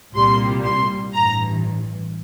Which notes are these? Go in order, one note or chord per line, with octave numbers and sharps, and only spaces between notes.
C2 A#2 G3 A#3 C6
C6
A1 G2 E3 A#5